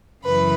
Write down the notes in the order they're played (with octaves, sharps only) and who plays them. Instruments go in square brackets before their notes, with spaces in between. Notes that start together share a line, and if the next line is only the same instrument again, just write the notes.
[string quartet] F#2 C#3 E3 B4